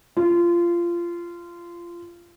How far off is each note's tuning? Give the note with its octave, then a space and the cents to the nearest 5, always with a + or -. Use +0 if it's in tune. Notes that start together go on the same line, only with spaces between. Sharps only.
F4 -20